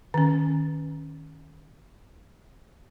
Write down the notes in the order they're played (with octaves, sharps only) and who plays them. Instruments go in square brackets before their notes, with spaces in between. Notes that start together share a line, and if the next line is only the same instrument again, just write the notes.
[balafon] D#3 C#4